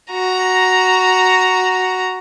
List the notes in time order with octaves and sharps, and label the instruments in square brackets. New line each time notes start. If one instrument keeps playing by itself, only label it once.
[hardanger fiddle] F#4 A#5